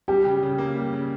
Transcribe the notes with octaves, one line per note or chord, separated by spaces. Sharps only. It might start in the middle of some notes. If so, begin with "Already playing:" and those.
G3 G4 G5
C#3
C#3
A#3
G3
C#3